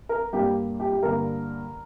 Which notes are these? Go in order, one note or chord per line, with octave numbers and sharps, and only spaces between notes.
A#4
G2 G3 A#3 G4
G4
G4
G2 D3 A#3 A#4